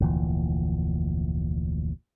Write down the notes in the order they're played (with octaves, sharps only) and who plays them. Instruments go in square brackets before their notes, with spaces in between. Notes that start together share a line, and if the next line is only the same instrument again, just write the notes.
[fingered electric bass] F1 D2 A#2 E3